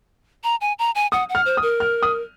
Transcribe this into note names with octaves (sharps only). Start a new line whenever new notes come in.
A#5
G#5
A#5
G#5
F#5 D#6
F#5
F6
C5
D#6
A#4
F6
D#6